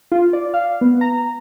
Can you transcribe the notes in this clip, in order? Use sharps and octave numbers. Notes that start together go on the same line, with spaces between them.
F4
D5
F5
B3
A#5